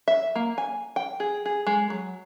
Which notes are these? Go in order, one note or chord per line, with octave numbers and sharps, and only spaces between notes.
E5
A#3
G#5
G5
G#4
G#4
G#3
F#3